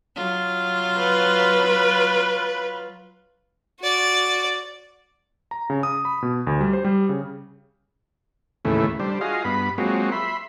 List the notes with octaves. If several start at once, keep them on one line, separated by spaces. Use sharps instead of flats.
F#3 F4
B4
F#4 D5
A#5
C#3
D#6
B5
B2
D2
G3
C5
G3
C#3
D#2 A2 C#3 E3 A3
G3 D4 C5
F4 F#4 G#4 D#5 F5
G2 B3 B5
F#3 G#3 A#3 C4 F4 F#4
E5 B5 C6